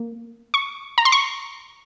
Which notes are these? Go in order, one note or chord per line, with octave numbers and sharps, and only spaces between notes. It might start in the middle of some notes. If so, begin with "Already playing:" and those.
Already playing: A#3
C#6
A#5
C6
C#6